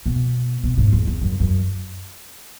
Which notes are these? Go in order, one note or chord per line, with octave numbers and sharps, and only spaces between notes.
B2
B2
G#2
E2
E2
F#2
F#2